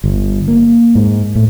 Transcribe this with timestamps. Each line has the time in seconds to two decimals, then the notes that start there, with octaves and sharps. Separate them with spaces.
0.04 G1
0.48 A#3
0.95 G#2
1.36 A2